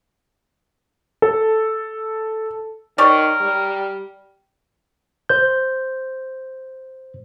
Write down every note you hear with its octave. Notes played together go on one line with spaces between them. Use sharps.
A4
D#3 G4 A#4 C#5 D5
G3
C5 G6